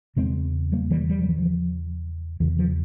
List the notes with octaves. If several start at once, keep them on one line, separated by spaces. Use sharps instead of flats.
E2 C#3 G#3 C4
G3 A#3
E3 G3
G3
F3
E3
F3
E2 C#3 E3
F3